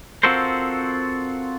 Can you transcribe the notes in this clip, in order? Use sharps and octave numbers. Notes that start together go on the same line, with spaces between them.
C4 F4 F#4 A4 A#4 C5